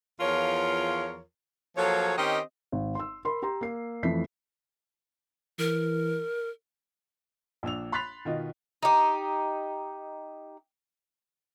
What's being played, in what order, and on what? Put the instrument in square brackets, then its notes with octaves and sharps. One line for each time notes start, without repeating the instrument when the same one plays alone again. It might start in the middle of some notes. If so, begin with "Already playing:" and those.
[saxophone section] E2 F3 F4 A#4 C#5
F3 F#3 A#3 G#4 A4 C#5
D#3 C4 C#4 G4 D#5
[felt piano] G#1
C6 E6
A#4 B5 C6
G4 A#5 C6
A#3 C7
F2 E3 A3 B6 C7
[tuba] E3 [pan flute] A#4
[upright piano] A#1 D4 E6 F7
B5 C6 F#6 A6 B6 F7
B2 D#3 F4 D#5
[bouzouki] D#4 G4